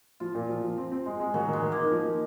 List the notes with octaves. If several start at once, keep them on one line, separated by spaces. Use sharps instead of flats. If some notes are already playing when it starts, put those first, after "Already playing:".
F3 F4
A#2
F3
F3
C4
C4
G#3
G#3
D#3 F#3
D#3 G#3
D#3
A#3
D#4
F3
D#4